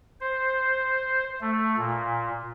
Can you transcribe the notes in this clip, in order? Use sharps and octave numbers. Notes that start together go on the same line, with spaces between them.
C5
A3
A#2